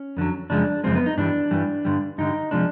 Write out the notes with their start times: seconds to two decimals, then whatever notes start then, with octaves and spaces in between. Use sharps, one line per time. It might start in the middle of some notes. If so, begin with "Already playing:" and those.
Already playing: C#4
0.17 F2 D3 F#3
0.50 F#2 C#3 F3 G#3 D4
0.84 F#2 C#3 F3 G#3 C4
0.95 B3
1.06 D#4
1.17 G2 E3 G3 D4
1.51 G2 E3 G3
1.85 G2 D3 G3
2.18 G2 D3 G3 D#4
2.51 C3 F3 G#3 D4